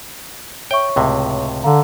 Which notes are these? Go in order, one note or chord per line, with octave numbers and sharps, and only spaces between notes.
C#5 E5 G5 C#6
C#2 A2 C3
D3 F5 A#5